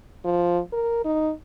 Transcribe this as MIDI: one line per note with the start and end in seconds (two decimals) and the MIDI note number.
0.25 0.59 53
0.73 1.03 70
1.05 1.32 63